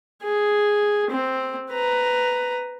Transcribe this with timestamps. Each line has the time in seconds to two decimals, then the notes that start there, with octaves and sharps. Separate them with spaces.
0.23 G#4
1.10 C4
1.72 B4 A#5